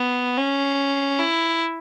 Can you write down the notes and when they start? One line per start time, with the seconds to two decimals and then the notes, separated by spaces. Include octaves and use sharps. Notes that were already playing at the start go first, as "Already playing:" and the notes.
Already playing: B3
0.38 C#4
1.19 E4